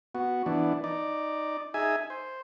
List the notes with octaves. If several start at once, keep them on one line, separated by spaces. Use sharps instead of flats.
B3 F#4
E3 B3 D4
D#4 D5
D#4 G#4 E5 G#5
C5